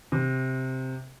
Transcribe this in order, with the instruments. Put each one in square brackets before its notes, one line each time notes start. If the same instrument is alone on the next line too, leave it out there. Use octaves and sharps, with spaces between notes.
[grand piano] C3